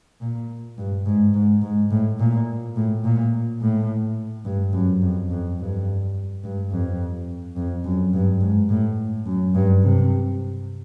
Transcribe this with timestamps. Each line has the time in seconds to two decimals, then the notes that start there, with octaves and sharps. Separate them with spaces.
0.21 A#2
0.78 G2
1.05 G#2
1.34 G#2
1.62 G#2
1.91 A2
2.19 A#2
2.76 A2
3.04 A#2
3.61 A2
4.45 G2
4.73 F#2
5.02 F2
5.29 F2
5.59 G2
6.44 G2
6.71 F2
7.56 F2
7.84 F#2
8.13 G2
8.41 G#2
8.69 A2
9.26 F#2
9.54 G2
9.82 C3